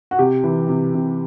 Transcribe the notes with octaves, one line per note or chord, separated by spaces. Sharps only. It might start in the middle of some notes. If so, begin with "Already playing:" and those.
F#4
C3 G4
E3
C3
C3